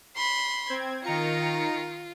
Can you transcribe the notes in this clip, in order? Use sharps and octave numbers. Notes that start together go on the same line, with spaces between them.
B5 C6
C4 G#6
D#3 F4 A#5 C#7